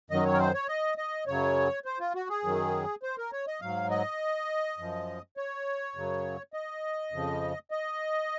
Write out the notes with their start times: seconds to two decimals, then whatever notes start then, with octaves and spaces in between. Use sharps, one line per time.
0.10 F#2 D#3 F#3 D#5
0.25 C#5
0.33 A#4
0.39 C5
0.54 C#5
0.68 D#5
0.98 D#5
1.27 F#2 C#3 F#3 C#5
1.85 C5
2.00 F4
2.15 F#4
2.29 G#4
2.44 F#2 D#3 F#3
3.03 C5
3.18 A#4
3.32 C#5
3.47 D#5
3.61 G#2 F#3 F5
3.90 D#5
4.78 F#2 F3
5.37 C#5
5.96 F#2 C#3 F#3
6.53 D#5
7.12 F2 C#3 F3
7.71 D#5